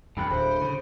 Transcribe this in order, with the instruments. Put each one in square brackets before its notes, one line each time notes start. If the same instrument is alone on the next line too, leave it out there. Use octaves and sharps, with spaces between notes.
[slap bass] E2 B2 [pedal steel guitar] D3 B5 F#6 [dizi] G5
[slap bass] D1 [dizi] C5
[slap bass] C#3